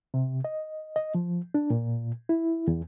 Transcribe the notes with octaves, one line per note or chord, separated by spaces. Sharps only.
C3
D#5
D#5
F3
D4
A#2
E4
E2